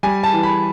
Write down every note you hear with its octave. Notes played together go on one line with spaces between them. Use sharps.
G3 G#5
A5
E3
B5